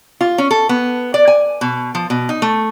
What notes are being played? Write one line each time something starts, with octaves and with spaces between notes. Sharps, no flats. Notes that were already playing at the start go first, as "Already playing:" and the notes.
F4
C#4
A4
B3
D5
G#5
B2
F3
B2
D#4
A3